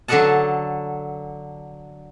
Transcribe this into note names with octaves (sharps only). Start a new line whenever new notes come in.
D3 F#3 A4 D#5 F#5 A5